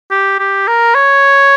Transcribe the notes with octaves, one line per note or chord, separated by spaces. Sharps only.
G4
G4
A#4
C#5